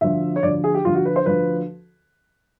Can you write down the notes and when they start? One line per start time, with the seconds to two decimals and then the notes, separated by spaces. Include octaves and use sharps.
0.01 D2 D3 F3 E5
0.36 C#5
0.43 D2 D3 F3 D5
0.64 G#4
0.74 G4
0.85 D2 D3 F3 F4
0.95 F#4
1.05 B4
1.16 C5
1.26 D2 D3 F3 B4